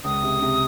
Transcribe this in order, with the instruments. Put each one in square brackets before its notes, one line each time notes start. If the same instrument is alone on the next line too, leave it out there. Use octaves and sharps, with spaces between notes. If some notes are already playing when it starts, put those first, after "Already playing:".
[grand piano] C#2 [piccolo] D#6
[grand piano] C3
C3